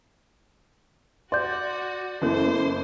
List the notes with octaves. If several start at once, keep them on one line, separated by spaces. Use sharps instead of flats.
F#4 D5 C6 G6
F#1 B3 E4 A4 C5